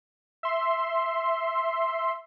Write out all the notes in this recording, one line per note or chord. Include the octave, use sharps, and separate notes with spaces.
E5 C6